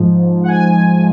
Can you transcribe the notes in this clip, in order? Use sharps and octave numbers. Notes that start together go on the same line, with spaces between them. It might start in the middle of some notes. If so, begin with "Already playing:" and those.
Already playing: G#2 F3
F#5
G#5